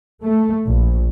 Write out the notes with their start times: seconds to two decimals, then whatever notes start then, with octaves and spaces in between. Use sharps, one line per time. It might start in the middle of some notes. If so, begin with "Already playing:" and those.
0.22 A3
0.66 A#1